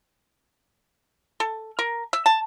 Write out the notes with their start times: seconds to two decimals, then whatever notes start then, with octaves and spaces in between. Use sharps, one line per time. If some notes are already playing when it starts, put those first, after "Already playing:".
1.40 A4
1.79 A#4
2.13 E5
2.26 A5